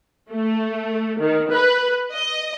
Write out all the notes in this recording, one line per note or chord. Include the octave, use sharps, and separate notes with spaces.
A3
D#3
B4
D#5